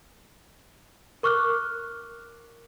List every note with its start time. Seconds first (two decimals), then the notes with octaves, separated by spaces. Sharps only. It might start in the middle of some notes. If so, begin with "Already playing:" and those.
1.23 A#4 C#6 D6 F6 F#6